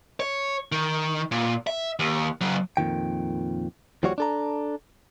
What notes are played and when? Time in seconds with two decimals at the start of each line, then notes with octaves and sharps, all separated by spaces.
0.20 C#5
0.72 D#3
1.32 A#2
1.67 E5
1.99 D#2
2.41 C#3 F#3
2.77 F2 A#2 D#3 G5
4.03 D#2 F3 G3 F#4 C#5
4.18 D4 A4 A#5